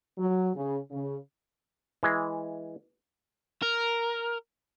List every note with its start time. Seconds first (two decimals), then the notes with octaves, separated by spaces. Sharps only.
0.18 F#3
0.56 C#3
0.91 C#3
2.03 E3 G#3
3.62 A#4